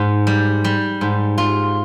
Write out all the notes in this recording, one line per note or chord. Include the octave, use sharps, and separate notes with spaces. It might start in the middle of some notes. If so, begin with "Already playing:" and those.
Already playing: G#2
G3
G3
G#2
F4